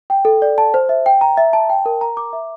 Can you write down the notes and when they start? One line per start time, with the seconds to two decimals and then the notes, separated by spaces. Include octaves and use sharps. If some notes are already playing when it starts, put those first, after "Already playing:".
0.10 G5
0.25 A4
0.42 D5
0.58 A5
0.74 C5
0.89 E5
1.06 G5
1.21 A#5
1.37 E5
1.53 A5
1.70 G5
1.86 A#4
2.01 A#5
2.17 D6
2.33 E5